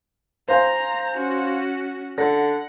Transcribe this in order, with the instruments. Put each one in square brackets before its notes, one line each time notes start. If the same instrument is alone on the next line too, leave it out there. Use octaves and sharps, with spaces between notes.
[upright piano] C5 F5 G#5 [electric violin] A#5
[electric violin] C#4 F#4
[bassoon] D3 [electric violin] F#5 [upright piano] A#6